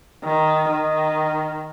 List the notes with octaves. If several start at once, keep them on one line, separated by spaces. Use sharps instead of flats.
D#3
D#3